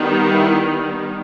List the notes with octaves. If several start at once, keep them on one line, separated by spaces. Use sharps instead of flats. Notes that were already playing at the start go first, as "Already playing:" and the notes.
Already playing: D#3 G3 B3
E4